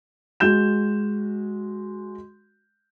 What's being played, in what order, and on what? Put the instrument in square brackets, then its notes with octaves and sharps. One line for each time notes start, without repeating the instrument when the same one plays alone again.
[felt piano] G#3 F#4 G6 E7